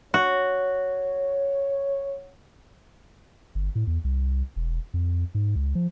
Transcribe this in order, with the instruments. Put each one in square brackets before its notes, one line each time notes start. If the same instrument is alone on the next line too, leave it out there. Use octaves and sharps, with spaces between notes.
[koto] F#4 [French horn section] C#5
[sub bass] G1
A2
E2
C2
E1
F2
G#2
C#2
F3